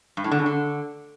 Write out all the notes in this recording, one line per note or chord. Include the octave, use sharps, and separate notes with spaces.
G2
A2
D3
C#3
D3